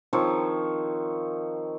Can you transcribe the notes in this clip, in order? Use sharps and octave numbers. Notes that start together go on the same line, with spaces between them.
D#3 F3 C4 C#5